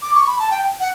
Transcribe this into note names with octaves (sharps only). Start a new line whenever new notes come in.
D6
C#6
B5
A5
G5
F#5